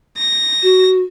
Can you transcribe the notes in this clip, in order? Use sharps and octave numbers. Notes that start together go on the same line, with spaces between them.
A#6
F#4